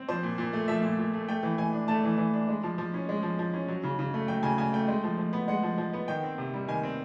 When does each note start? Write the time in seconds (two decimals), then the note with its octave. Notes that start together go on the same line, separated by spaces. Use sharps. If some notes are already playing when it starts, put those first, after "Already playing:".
Already playing: C4
0.09 F3 C5
0.23 A#2
0.38 A#2
0.53 A3
0.68 F3 E5
0.83 A#2
0.98 A#2
1.13 A3
1.29 A3 G5
1.43 E3
1.58 E3 G#5
1.73 D4
1.88 A3 A5
2.04 E3
2.18 E3
2.34 D4
2.48 G#3
2.63 F3
2.78 F3
2.94 C#4
3.09 G#3
3.23 F3
3.39 F3
3.54 C#4
3.68 F#3
3.83 C#3
3.99 C#3
4.14 A3
4.28 F#3 G5
4.43 C#3 G#5
4.58 C#3 G#5
4.73 A3 G5
4.88 G#3
5.04 F3
5.18 F3
5.33 B3
5.48 G#3 F#5
5.63 F3
5.78 F3
5.93 B3
6.08 D#3 G5
6.23 C4
6.38 C3
6.54 G3
6.68 D#3 G#5
6.83 C4